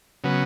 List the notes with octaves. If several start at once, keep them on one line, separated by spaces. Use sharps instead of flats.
C#3 F#3 B3